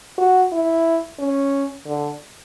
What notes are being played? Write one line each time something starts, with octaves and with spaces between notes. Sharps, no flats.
F#4
E4
C#4
D3